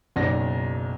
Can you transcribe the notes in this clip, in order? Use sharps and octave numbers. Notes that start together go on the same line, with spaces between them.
F#1 B1 D5 A#6